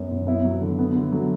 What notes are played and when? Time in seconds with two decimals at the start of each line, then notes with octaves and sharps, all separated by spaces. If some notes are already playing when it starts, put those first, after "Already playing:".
Already playing: F#2 B3
0.11 F#2
0.27 B3 E4
0.45 F#3
0.61 D3
0.79 B3
0.96 D3
1.12 F#3